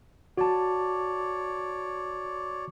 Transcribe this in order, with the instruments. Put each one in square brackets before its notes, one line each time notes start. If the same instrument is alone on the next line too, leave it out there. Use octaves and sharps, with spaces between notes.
[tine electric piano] F#4 A5 [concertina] C#5 D5